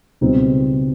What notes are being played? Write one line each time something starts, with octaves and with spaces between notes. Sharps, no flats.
C#2 B2 G3 C4 D#4